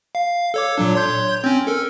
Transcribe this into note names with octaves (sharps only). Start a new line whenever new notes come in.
F5
A4 C#5 D6
A#2 F#3 D4
C#5 C6 G6
C4 C#4
A4 A#4